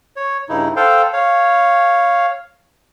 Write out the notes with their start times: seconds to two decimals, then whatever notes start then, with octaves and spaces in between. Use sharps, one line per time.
0.16 C#5
0.49 G2 C#3 D#4 E4
0.76 A4 C5 F5 G5
1.13 C#5 F5